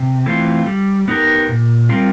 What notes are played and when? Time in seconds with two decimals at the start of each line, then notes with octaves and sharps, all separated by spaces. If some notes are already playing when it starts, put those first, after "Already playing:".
Already playing: C3
0.26 E3 A3 C4 F4
0.66 G3
1.08 B3 D#4 G4 A#4
1.49 A#2
1.89 G3 C4 F4 A#4